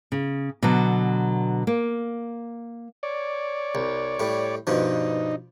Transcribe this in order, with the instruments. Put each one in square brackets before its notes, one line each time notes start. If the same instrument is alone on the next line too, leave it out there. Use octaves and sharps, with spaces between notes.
[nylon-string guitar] C#3
B2 D3 F#3
A#3
[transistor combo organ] C#5 D5
[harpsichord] C2
A2 G3
[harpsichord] G2 B2 F3 [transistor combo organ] D#4